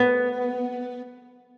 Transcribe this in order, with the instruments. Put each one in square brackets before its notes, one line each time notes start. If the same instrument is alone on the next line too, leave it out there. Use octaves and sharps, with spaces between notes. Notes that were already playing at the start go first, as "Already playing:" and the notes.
Already playing: [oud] B3